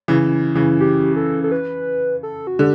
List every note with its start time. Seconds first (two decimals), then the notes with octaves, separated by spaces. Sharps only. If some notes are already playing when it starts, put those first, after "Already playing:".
0.08 C#3 E3
0.55 C#3 E3
0.80 G4
1.16 A4
1.44 A4
1.52 B4
2.23 A4
2.47 F#4
2.59 D3 G4